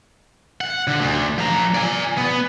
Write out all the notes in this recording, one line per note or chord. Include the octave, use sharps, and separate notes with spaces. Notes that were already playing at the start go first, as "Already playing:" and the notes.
F#5
D3
D2
F3 A#5
D5 G#5
B3